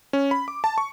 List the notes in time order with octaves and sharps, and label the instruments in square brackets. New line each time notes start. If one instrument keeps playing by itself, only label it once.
[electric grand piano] C#4
B5
D6
A5
C#6